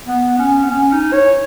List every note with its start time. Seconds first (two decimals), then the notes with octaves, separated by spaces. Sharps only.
0.07 B3
0.39 C#4
0.64 B3
0.70 C#4
0.92 D#4
1.13 C#5